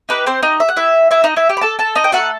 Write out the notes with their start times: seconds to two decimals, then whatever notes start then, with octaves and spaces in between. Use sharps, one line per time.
0.09 D#4 G4 B4
0.26 C4 C5
0.43 D#4 D#5
0.60 E5
0.69 F#5
0.77 E4 E5
1.11 E4 E5
1.24 D#4 D#5
1.36 E4 E5
1.49 G4 G5
1.57 B5
1.61 A4 A5
1.79 A4 A5
1.95 D#4 D#5
2.04 G5
2.12 A3 D#4 F#4 A4 F#5